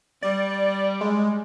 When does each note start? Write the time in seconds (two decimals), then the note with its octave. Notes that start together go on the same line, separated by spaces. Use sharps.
0.23 G3 D5
1.01 G#3